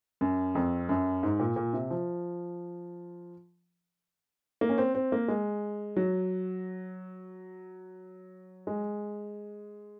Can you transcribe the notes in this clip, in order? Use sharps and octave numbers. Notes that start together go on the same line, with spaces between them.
F#2
F2
F#2
G#2
A#2
A#2
C3
F3
A#3
C#4
C4
C4
A#3
G#3
F#3
G#3